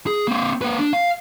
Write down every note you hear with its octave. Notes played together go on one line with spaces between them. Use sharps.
G#4
A#3 C4
A#3 B4
D4
F5